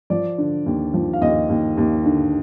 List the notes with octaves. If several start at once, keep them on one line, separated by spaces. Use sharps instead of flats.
F3 D5
D3
D#2
F3
F5
D#2 D#5
D#2
D#2
D3